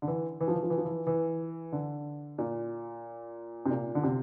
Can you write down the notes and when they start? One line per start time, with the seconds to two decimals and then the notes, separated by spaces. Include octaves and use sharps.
0.02 D3
0.08 E3
0.41 E3
0.48 F3
0.55 E3
0.63 F3
0.70 E3
0.78 F3
0.85 E3
1.07 E3
1.72 D3
2.38 A#2
3.66 C3
3.70 A#2
3.95 D3
4.03 C3